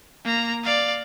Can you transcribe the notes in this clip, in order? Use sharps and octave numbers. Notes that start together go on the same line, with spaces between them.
A#3 A#5
D5 F5